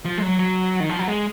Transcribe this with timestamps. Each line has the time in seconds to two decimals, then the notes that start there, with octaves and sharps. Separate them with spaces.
0.05 F3
0.17 G#3
0.22 F#3
0.39 F#3
0.80 D#3
0.89 F3
0.99 F#3
1.08 G#3